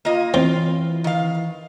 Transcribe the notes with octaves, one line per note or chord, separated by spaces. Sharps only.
A#3 F4 D#5
E3 C4 F4
D#3 F5